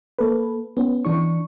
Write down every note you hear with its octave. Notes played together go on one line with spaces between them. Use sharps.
A#3 A4 B4
B3 C#4
E3 D4 C#6